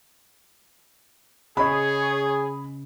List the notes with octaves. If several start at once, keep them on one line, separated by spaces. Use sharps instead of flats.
C#3 G#4 C#5 D#5 B5